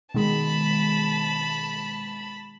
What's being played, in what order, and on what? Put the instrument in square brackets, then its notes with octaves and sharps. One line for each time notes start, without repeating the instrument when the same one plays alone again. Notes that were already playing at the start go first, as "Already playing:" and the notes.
[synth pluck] B2 D#3 G#3 [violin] A5 B5